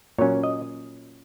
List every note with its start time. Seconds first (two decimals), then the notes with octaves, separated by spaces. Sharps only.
0.18 A#2 F#3 C#4 C#5
0.44 D#5